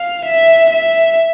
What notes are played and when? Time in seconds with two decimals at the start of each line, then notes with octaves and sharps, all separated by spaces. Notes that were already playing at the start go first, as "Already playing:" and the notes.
Already playing: F5
0.25 E5
0.70 E5